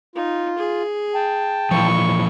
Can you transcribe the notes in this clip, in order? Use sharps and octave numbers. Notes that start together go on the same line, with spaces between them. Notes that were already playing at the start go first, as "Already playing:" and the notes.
D#4 F4
G#4
G5 A5
A#2 E3 F3 C#6